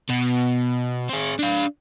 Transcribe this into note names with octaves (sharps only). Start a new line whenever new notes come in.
B2
C4 G#4
D4 F5